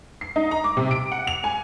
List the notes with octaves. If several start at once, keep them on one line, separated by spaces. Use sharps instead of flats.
C7
D#4
A#5
D6
C3
D7
F#5
F7
G#5